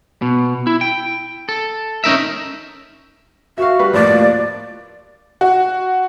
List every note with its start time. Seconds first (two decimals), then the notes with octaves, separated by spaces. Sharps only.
0.22 B2
0.67 E4
0.81 G5
1.49 A4
2.04 C#4 D#4 A#4 E5
3.58 F#4 E5 F5
3.79 G3 B4
3.93 D#2 A2 F3 D5
5.41 F#4